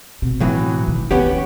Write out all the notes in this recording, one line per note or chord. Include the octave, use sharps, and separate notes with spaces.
B2 C4
A2 E3 F#3
D#3
D#2 E3 B3 C#4 G4